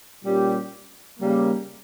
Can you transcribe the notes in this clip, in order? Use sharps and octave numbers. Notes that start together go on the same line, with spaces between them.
A#2 G3 C#4 G4
C#3 G3 A#3